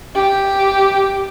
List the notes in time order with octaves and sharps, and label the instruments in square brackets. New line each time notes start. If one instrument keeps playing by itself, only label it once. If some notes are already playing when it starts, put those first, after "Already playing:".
[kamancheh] G4